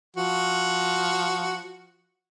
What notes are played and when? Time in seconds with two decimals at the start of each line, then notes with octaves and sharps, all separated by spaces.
0.16 F3 F#4